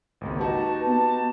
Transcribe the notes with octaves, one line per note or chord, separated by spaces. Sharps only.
G#1 C#2 A#3
D#4 F#4 G4 B4 A5
B3 A5